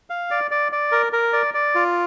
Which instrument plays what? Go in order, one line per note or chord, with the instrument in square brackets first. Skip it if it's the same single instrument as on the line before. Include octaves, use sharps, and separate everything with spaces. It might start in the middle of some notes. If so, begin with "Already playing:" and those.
[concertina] F5
D5
D5
D5
A#4
A#4
D5
D5
F4